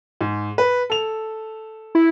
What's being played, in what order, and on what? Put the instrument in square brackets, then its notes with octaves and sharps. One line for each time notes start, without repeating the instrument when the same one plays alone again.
[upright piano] G#2
B4
A4 F7
[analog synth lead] E4